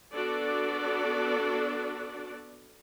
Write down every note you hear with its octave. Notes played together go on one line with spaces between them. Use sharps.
B3 D4 F#4 A4 D5